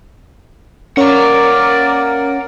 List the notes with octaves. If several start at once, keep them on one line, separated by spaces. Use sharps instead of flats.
A#3 C#4 A#4 C#5 D5 F#5 A#5